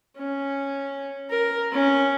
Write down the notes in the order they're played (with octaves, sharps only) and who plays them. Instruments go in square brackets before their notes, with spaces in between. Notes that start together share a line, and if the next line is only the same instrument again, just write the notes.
[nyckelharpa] C#4
A#4
C#4